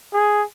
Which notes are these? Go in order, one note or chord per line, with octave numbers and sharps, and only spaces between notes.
G#4